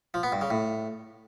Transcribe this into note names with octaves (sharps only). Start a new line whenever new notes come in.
F3
B3
G2
C#3
A2